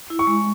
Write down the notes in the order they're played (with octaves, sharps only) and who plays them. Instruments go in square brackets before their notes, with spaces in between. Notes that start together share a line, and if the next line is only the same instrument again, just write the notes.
[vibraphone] E4
[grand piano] C#6
[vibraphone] G#3